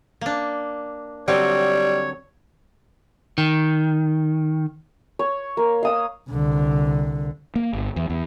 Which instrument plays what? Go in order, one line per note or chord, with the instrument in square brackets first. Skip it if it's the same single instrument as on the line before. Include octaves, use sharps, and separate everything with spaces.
[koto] A#3 D4
[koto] D3 F#3 C4 [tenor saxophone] G3 [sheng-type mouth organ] C#5
[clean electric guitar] D#3
[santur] C#5
A#3
F5 D#6 E6
[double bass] C2 D3
[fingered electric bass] A#3
G1
E2
E2